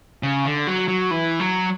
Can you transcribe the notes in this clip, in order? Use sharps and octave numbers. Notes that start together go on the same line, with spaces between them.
C#3
D3
F#3
F#3
E3
F#3